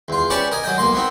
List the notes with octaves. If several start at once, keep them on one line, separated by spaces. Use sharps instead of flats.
E2 F4
C#4 G4 B4 D5 A5 C#6
A#4 D#5 G#5
F#3 D#5 G5
B1 A#3 C6
B3 C4 D#4